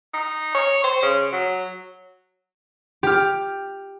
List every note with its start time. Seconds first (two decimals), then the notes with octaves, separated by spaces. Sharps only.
0.14 D#4
0.55 C#5
0.84 C5
1.03 C#3
1.32 F#3
3.03 G4 F6